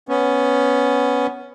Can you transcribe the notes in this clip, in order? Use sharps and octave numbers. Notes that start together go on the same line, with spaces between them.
B3 C#4